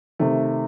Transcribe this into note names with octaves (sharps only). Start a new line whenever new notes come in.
C3 D#3 A3